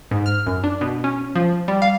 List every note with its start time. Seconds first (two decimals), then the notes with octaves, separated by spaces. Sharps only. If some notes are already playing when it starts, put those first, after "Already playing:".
0.11 G#2
0.26 F6
0.47 F#2
0.64 D4
0.81 B2
1.04 C#4
1.35 F3
1.68 G3
1.82 F5